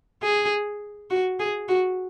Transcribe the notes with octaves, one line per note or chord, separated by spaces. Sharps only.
G#4
F#4
G#4
F#4